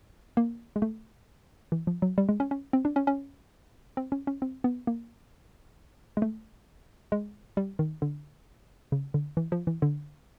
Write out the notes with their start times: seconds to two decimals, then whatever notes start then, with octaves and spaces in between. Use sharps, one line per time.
0.37 A#3
0.76 G#3
0.82 A3
1.72 E3
1.87 F3
2.02 F#3
2.18 G3
2.29 G#3
2.40 C#4
2.51 C#4
2.73 C4
2.85 D4
2.96 C#4
3.07 C#4
3.97 C4
4.12 C#4
4.27 C#4
4.42 C4
4.64 B3
4.87 A#3
6.17 G#3
6.22 A3
7.12 G#3
7.57 G3
7.79 D#3
8.02 D3
8.92 C#3
9.14 D3
9.37 E3
9.52 F3
9.67 E3
9.82 D3